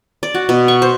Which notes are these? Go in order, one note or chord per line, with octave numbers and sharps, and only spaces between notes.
D5
F#4
B2
C#6
C5